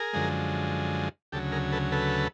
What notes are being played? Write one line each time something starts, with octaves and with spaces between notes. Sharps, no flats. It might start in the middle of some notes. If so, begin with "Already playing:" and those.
Already playing: G#4 A#4
F#2 D3 F3 G#3
D2 C#3 F#3 G4 A4
G#4 A#4
A4 B4
A4 B4